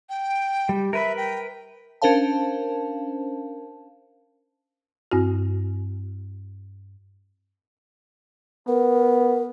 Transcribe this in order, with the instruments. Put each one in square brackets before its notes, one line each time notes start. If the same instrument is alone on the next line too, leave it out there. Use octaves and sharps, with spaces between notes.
[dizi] G5
[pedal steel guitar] G3
[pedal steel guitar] A#4 B4 B5 [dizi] E5
[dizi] G5
[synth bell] C#4 D4 A#4 C5 F5 A5
[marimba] G2 C4 E4 F#4
[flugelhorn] B3 [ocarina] A#4